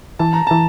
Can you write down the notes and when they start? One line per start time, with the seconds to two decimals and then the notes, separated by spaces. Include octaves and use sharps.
0.19 E3 A5
0.33 A#5
0.47 E3 A5